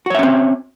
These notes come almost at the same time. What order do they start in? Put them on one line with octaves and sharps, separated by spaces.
F#4 C#5 E5 C#4 C4